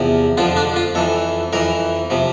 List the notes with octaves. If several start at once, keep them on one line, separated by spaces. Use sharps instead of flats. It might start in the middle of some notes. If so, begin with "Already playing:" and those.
Already playing: E2 C3 F3
F2 D3 F3 F4
D4
F4
F2 E3 A4
F2 E3 A#4
C3 F3